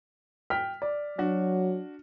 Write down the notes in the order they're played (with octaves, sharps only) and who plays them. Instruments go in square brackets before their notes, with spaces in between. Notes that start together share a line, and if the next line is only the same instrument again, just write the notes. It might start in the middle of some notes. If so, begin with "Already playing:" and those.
[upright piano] G5 F6 B6
D5
[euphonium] F#3 [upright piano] D4 F#4